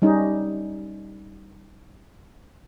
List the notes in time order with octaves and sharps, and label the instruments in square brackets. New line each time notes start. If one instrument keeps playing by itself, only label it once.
[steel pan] G3 C#4 D#4